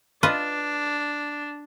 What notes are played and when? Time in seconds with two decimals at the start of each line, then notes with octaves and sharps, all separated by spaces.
0.23 D4 F4 B4 D#5